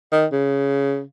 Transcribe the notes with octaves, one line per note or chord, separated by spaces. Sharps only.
D#3
C#3